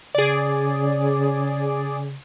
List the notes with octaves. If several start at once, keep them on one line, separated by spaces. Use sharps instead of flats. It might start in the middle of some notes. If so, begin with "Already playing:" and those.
C#3 G#4 D5